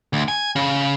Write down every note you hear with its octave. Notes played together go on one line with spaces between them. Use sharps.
D2
G#5
C#3